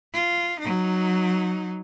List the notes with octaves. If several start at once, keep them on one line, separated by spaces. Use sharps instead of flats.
F4
F#3 D#4